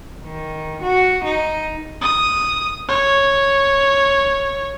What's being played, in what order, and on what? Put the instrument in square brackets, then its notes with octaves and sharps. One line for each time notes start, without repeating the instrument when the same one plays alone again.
[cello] D#3
F#4
D#4
[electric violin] D#6
C#5